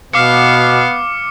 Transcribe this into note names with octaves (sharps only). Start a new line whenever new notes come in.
B2 B3 F5 D6 F6 C#7